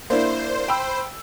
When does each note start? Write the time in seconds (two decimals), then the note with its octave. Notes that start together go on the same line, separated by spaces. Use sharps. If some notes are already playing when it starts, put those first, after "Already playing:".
0.10 A#3 D4 E4 C5
0.68 G5 B5 E6